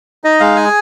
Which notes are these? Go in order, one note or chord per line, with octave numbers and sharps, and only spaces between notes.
D#4 D#5
G#3 F5
G#4 G#5